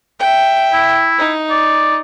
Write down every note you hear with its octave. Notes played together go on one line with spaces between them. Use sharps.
E5 G5
E4
D#4
D5